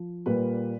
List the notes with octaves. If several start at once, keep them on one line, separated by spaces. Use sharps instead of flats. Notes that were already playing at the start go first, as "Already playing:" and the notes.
Already playing: F3
A#2 G3 A#3 B4